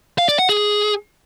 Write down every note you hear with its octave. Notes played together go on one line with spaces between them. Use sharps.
F5
D5
F#5
G#4